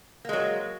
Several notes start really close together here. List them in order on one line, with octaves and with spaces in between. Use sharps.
A#3 G#3 F#3